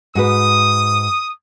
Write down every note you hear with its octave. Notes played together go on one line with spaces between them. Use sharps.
G#2 F#4 B4 D#6